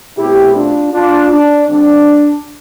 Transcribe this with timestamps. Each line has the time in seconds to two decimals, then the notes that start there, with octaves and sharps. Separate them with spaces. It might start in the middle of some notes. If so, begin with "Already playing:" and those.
0.18 B2 A3 C4 E4 G4
0.56 D4 F4
0.93 D4 F4
1.31 D4
1.68 D3 G3 C4 D4